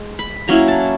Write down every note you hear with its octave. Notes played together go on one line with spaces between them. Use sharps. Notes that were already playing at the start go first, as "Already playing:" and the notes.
Already playing: G#3
B5
F#3 A#3 C#4 E4 A#5
A5